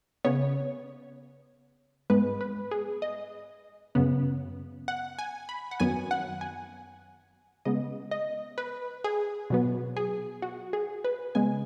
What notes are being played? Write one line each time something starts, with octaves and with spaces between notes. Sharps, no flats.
C#3 B3 C#5
G#2 G#3 B3 B4
B4
G#4
D#5
F#2 C#3 B3
F#5
G#5
B5
F#5
F#2 D#3 F#3 B3 G#5
F#5
G#5
C#3 G#3 B3 D#5
D#5
B4
G#4
B2 F#3 B3
G#4
F#4
G#4
B4
C#3 G#3 B3 G#5